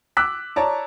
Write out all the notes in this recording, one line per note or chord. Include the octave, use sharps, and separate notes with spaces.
D6 E6 F#6 B6
C#5 D5 A5 A#5